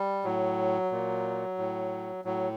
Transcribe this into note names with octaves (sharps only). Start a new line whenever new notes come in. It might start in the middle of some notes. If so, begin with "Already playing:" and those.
Already playing: G3
A2 F#3
A#2
A2
A2 F#3